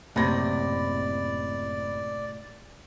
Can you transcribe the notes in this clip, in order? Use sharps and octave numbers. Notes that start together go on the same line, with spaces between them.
F#1 A2 C3 D5 B5 A#6